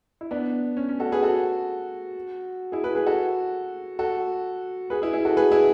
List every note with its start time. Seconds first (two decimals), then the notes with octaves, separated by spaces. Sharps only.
0.21 E4
0.31 B3 D4
0.77 C#4
0.89 C#4
1.00 F#4 A4
1.12 G#4 B4
1.23 F#4 A4
2.72 E4 G#4
2.84 G#4 B4
2.95 G#4 B4
3.06 F#4 A4
3.99 F#4 A4
4.90 G#4 B4
5.02 E4 G#4
5.13 E4 G#4
5.25 F#4 A4
5.37 G#4 B4
5.52 E4 G#4